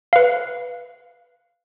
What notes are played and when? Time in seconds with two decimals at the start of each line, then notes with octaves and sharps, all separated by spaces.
0.13 B4 F5